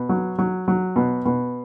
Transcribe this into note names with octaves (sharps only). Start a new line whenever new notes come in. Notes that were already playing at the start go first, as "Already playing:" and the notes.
Already playing: B2
F#3
F#3
F#3
B2
B2